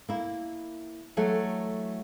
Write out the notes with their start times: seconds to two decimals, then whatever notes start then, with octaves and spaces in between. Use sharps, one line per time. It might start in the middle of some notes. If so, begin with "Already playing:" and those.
0.09 A#3 E4
1.17 E3 F#3 A3 A4